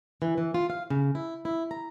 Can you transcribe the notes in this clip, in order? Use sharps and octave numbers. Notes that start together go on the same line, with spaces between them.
E3
E3
F4
F5
C#3
E4
E4
A#5